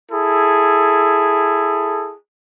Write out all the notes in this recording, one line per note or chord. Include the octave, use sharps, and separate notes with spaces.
E4 G#4 A4